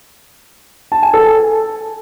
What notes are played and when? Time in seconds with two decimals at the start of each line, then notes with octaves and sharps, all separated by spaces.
0.92 A5
1.03 G#5
1.14 A4